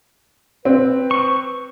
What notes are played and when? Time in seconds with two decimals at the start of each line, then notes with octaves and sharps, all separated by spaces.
0.65 C4 B4
1.11 C#6